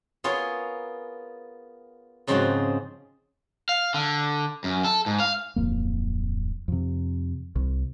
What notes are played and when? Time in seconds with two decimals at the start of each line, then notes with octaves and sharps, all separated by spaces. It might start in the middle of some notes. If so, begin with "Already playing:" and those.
0.24 B3 F4 G#4 A#4 C#5
2.27 G#2 C#3 F3 G#3 C4 F#4
3.69 F5
3.94 D3
4.64 F#2
4.85 A4
5.06 G#2
5.20 F5
5.56 D1 F2 A#3
6.68 F2 C3
7.56 C2